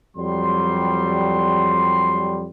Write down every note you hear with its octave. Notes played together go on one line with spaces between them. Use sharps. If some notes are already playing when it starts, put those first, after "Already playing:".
F2 F#3 G3 C6